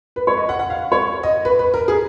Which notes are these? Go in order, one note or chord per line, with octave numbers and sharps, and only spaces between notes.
B4
C#5
D#5
F#5
F#5
F5
C#5
D#5
B4
B4
A#4
G#4